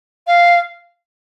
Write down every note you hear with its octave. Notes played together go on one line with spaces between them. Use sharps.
F5